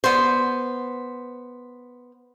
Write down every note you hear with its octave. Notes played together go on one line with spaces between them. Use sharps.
B3 C5